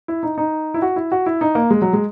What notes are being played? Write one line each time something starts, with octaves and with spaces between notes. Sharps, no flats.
E4
D#4
D#4
E4
F#4
E4
F#4
E4
D#4
A#3
G#3
F#3
G#3